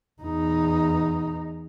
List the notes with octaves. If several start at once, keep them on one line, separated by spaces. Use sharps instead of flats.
E2 D#4